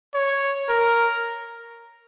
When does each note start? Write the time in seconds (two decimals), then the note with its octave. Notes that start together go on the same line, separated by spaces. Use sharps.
0.14 C#5
0.69 A#4